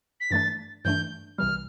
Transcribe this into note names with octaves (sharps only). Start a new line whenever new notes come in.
B6
G2 E3 A3 D4 A6
G2 E3 A3 D4 G6
C2 C3 E3 G3 F6